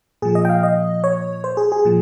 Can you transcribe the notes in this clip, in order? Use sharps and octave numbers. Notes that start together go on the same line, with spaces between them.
A#2 F3 G#4
D#5
G5
F5
D#5
C#5
C5
G#4
G#4
A#2 F3